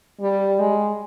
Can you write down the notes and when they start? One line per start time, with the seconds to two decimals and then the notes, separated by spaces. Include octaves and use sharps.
0.21 G3
0.59 G#3